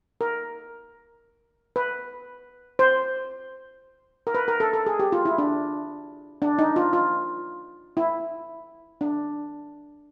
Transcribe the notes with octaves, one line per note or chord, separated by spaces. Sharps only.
A#4
B4
C5
A#4
B4
A#4
A4
A4
G#4
G4
F4
E4
D4
D4
D#4
F4
F4
E4
D4